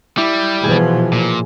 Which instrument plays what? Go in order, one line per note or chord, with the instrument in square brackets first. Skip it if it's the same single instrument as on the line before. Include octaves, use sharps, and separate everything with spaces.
[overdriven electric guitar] G3 [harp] E4 D6
[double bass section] B2 E3 F3 [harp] G#4
[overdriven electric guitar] A#2